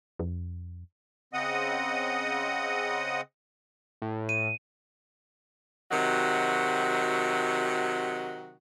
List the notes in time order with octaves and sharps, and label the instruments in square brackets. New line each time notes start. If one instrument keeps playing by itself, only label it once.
[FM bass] F2
[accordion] C#3 C4 D#5 F#5 D#6
[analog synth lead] A2
[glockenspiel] D#7
[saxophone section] C3 D#3 F#3 F#4 D#5